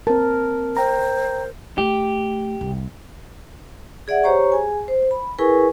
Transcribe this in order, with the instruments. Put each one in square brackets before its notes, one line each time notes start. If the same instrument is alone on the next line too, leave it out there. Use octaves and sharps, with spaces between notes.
[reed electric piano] C4 A5 [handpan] A#4
[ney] C5 [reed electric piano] G5 A#5
[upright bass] A3 [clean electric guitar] G4
[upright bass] C2
[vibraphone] G#4 D5 E5 F#5
G4 C5 C#5 A#5 C#6
G#4 G#5
C5
B5
E4 G#4 A#4 B4 G#5 C#6